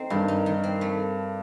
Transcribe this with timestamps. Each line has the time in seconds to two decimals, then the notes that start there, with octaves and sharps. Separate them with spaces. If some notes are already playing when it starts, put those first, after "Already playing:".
Already playing: A3 C4 D#4
0.10 G2 D#3
0.28 D#4
0.46 D#3
0.64 C4
0.81 A3